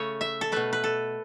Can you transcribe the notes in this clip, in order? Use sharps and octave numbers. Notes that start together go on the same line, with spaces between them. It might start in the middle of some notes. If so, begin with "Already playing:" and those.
Already playing: C#3 A3 C#5
E5
A4
B2 A3 B4
B4
A4